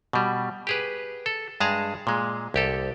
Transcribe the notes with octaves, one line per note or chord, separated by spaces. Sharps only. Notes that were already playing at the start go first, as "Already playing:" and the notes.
B2 G3
G4 G#4 B4
A4
G2 G#3 G#4 A5 A#5
A#2 G#3
C2 G4 A4